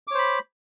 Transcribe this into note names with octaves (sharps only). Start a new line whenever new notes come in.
C5 C#5 B5 D6